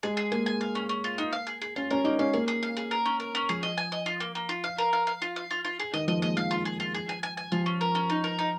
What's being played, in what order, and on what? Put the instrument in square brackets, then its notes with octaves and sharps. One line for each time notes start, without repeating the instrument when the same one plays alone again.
[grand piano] G#3 [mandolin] G#4
[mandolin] G#4
[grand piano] A#3 [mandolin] G#5
[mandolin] G#5
F5
C#4
C#4
F4
D#4
F5
G#4
G#4
[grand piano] C#4 [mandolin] F4
[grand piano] C#4 [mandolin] A#4
[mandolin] A#3 [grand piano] D#4
[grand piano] C#4 [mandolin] F5
[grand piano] A#3 [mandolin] G#4
[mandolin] G#4
F5
G#4
A#4
C#4
A#4
C#4
[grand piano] F3 [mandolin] G#4
[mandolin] D#5
G#5
D#5
F4
A#3
A#3
F4
F5
A#4
F5
F5
F4
F5
F4
F4
G#4
[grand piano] D#3 [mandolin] D#5
[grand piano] F3 [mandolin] D#5
[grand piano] A#3
[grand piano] G#3 [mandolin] D#5
[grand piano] F3 [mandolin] F5
[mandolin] F4
G#4
F4
G#4
G#5
G#5
G#5
[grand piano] F3 [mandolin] F4
[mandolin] C#4
A#4
C#4
D#4
A#4
D#4